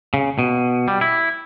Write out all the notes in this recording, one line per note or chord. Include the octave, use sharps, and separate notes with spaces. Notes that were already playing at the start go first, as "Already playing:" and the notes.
C#3
B2
G3
E4